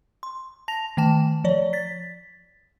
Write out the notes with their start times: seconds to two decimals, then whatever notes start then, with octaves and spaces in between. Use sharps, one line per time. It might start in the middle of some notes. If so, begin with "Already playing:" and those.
0.23 C6
0.68 A5 A#6 F7
0.97 D#3 A3 G5 A5 E7
1.44 F3 C#5 D5
1.73 A6 B6